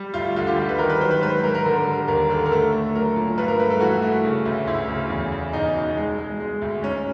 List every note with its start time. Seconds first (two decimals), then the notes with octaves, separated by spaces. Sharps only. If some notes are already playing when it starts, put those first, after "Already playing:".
Already playing: G3
0.14 D2 F4
0.36 D3 F4
0.47 G4
0.57 G3
0.69 B4
0.79 D#3 A#4
0.89 B4
1.01 F#3 C5
1.11 B4
1.22 G#2 B4
1.43 G#2 A#4
1.55 A#4
1.65 D3 A#4
1.87 G3
2.08 D#2 A#4
2.29 D3 A4
2.46 A#4
2.52 A3 A4
2.73 A3
2.95 F#3 A#4
3.16 A#2
3.38 G2 B4
3.48 A#4
3.59 A3 B4
3.70 A4
3.80 E3 F#4
4.02 A3
4.25 C#3
4.45 D2
4.67 D2 E4
4.88 C#3
5.10 E2
5.32 E2
5.53 E2 D#4
5.75 B2
5.97 G#3
6.18 G#3
6.40 G#3
6.62 D2
6.82 G#2 C#4